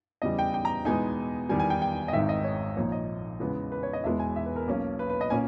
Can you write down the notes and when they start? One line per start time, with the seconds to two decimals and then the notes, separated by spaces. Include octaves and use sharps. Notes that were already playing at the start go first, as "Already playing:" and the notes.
0.22 E2 C#3 G3 D#5
0.39 G5
0.54 G5
0.65 A#5
0.85 E2 B2 G#3 B3 D#4 G#5
1.49 E2 D#3 G3 G#5
1.60 G#5
1.70 G5
1.82 G5
2.08 D#5
2.13 G#1 G#2 D#3 E5
2.29 D#5
2.44 C#5
2.77 A#1 A#2 A#3 D#4 C#5
2.92 D#5
3.40 E2 C#3 G#3 B3
3.72 B4
3.83 C#5
3.93 D#5
4.04 E1 E2 B2 G#3 B3 E5
4.19 G#5
4.36 E5
4.46 B4
4.56 A#4
4.67 B1 B2 A#3 C#4
4.99 B4
5.10 B4
5.21 D#5
5.30 A#2 A#3 C#4 G#5